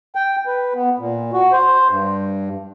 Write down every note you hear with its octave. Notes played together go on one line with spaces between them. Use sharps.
G5
B4
B3
A#2
F#4
C5
G2